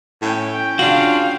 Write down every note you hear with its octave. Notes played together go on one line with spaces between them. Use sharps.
A2 C#4 G5
C#3 D4 F4 F#4 F5